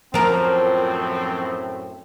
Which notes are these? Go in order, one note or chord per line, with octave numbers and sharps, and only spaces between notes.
F#2 A2 F3 C4 A#4